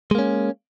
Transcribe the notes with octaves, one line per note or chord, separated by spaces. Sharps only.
G#3 A#3 C#4